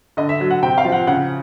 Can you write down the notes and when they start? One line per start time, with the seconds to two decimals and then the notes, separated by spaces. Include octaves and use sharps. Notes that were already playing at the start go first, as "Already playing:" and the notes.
0.17 D3 D#5
0.29 E5
0.40 F#3
0.51 F#5
0.63 C3 G5
0.78 F5
0.85 F3
0.92 F#5
1.07 C#3 F#5